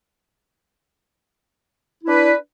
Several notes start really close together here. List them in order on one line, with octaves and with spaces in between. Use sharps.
E4 D4 B4